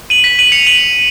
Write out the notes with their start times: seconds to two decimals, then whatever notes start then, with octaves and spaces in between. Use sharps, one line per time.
0.10 D#7 F#7
0.24 B6 D#7
0.39 D#7 F#7
0.52 C#7 F7
0.67 D#7 F#7